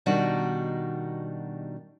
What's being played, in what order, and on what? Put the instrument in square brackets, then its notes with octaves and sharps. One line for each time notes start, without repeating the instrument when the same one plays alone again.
[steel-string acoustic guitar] B2 D#3 G3 D4 D#4 F#4